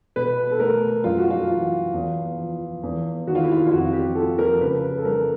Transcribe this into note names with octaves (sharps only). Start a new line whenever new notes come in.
B2 B4
A4
A3 A#4
F#2 F4
F#4
F4
E3
E2
F3
E2
D#3 F#4
F4
E4
F4
F4
F2 F#4
G4
F3 A4
A#4
C#3 B4
A4
G3 A#4